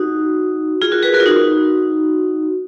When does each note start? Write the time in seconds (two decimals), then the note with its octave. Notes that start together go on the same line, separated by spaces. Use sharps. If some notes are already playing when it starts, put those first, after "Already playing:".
Already playing: D#4 F#4
0.82 F4 G#4
0.92 F#4 A#4
1.03 G#4 B4
1.14 F#4 A#4
1.20 F4
1.26 D#4 F#4